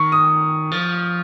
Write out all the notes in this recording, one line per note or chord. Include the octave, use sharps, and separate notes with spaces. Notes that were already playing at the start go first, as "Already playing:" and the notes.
Already playing: D#3 C#6
D#6
F3